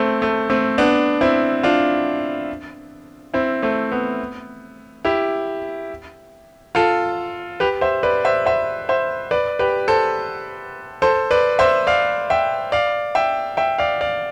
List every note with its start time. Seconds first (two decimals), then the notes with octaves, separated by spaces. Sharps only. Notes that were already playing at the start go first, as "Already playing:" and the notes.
Already playing: A3 C4
0.22 A3
0.50 A3 C4
0.78 B3 D4
1.21 C4 E4
1.63 D4 F4
3.34 C4 E4
3.62 A3 C4
3.92 B3
5.05 E4 G4
6.75 F4 A4
7.60 G4 B4
7.81 C5 E5
8.03 B4 D5
8.25 C5 E5
8.46 C5 E5
8.89 C5 E5
9.31 B4 D5
9.59 G4 B4
9.88 A4 C5
11.02 A4 C5
11.31 B4 D5
11.59 C5 E5
11.87 D5 F5
12.30 E5 G5
12.72 D5 F5
13.15 E5 G5
13.57 E5 G5
13.78 D5 F5
14.01 D5 F5